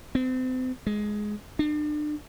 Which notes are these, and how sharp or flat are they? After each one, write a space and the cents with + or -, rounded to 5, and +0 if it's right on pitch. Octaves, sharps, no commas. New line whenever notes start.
C4 -35
G#3 +10
D4 +35